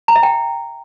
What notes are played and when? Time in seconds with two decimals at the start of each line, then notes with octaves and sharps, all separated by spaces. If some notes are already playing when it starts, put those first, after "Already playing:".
0.08 A#5
0.16 E5
0.23 G5